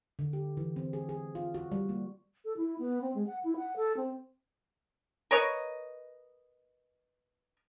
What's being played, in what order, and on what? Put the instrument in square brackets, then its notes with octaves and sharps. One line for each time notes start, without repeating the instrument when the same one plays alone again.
[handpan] D3
G4
E3
C4
G#4
G#4
F4
F#4
G3
A#3
[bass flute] A4
E4
B3
C4
G#3
F#5
E4
F#5
A4
C4
[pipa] A#4 B4 C#5 D#5